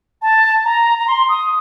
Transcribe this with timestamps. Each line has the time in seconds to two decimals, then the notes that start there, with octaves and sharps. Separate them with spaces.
0.22 A5
0.65 A#5
0.98 A#5
1.08 C6
1.29 D#6